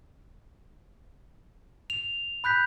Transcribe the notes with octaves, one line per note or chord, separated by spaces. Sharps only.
F7
B5 F#6 G6 B6